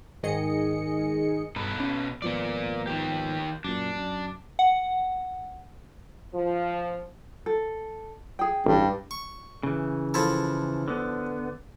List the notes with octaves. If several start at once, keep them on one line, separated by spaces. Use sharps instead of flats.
G#2 D#3 G#4 D#5 C#7
G2 B2 A4 B4
C#4
G#1 F3 A#3 B3 D5
D#3 G4
F#2 A#2 D4
F#2
F#5
F3
A4
G#4 G5
A1 G2
C#6
C#3 E3
F3 E4 A4
D3 B3